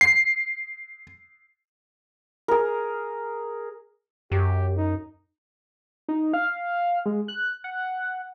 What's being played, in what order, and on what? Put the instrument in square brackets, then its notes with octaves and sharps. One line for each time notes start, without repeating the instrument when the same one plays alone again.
[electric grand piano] C7
[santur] G#4 A#4
[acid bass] F#2 [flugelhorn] G4
[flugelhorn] D#4
[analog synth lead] D#4
F5
G#3
F#6
F#5